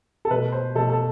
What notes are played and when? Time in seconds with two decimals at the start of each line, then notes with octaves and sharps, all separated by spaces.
0.25 A4
0.31 B2 A3 B4
0.52 C5
0.75 B2 A3 A4
0.90 A4